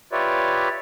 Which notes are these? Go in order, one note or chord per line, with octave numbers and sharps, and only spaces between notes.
F4 G4 B4 C#5 D5 E5